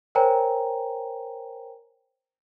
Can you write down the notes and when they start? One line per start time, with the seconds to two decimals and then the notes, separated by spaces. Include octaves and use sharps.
0.15 A#4 C5 C#5 G5 G#5 A#5